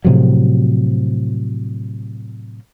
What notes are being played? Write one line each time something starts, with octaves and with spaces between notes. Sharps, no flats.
A2 C3 F3 F#3